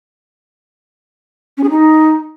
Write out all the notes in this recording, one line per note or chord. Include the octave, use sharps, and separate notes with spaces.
C#4
G#4
D#4